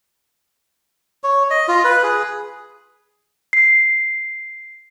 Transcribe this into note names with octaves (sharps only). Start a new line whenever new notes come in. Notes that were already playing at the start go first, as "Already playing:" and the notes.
C#5
D#5
F4
B4
G#4
C7